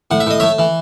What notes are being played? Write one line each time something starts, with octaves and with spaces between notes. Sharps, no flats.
A2 F#5
E5
A2 D#5
A3 C#5 E5
E3